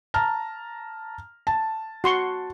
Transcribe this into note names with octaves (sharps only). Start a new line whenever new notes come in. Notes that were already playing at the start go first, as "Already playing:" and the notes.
A5 A#5 F6
A5
F#4 C6 C#6